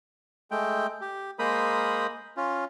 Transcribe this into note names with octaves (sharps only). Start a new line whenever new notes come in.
G#3 A3 G5
G4
G#3 A#3 A#4 C5 B5 D#6
C#4 F4